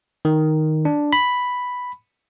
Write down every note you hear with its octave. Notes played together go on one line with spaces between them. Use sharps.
D#3
D4
B5